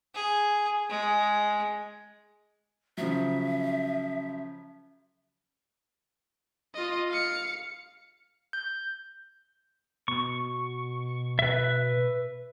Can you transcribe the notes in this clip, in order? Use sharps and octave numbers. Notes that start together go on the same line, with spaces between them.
G#4
G#3
C#3 F3 F#3 E5
F4 D#5
F5 C#7
G6
B2 C#6
B4 E5